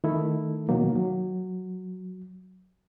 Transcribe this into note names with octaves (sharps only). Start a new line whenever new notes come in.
D#3 A3 E4 A4
B2 D#3 F#3 A#3
F#3